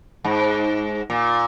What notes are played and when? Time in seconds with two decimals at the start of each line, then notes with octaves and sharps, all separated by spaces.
0.24 G#2
1.10 A#2